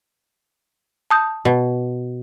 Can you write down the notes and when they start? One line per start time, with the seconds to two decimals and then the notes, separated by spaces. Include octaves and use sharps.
1.10 A5 D#6 G6
1.45 B2